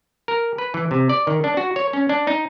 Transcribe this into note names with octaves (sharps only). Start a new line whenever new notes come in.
A#4
B4
E3
C3
D5
D#3
D4
F#4
C#5
C#4
D4
D#4